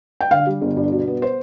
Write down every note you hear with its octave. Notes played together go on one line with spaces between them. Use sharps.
G5
D3 F5
G3
G1
G2
B2
B3
C5